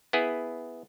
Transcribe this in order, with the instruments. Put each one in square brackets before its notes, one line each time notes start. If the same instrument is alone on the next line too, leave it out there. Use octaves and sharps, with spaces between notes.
[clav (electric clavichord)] B3 E4 G#4